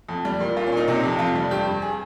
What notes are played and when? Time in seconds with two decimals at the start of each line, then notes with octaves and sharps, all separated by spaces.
0.09 F2
0.25 G3
0.40 A#2
0.57 A#2 F4
0.67 C#4
0.72 A#2 D#4
0.88 C3 D#4
1.04 F2
1.19 F2 F4
1.35 G3
1.51 G2 G4
1.67 G2
1.82 G#4